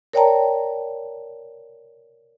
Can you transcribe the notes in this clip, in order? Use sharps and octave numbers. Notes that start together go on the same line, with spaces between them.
A#4 C#5 D5 G5 A5 A#5